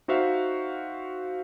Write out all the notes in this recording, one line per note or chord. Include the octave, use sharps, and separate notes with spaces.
D#4 F#4 C5 E5 F5